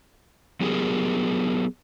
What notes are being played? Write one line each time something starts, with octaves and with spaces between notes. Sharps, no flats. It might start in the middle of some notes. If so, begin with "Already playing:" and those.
F#3 B3 G4 G#4 A#4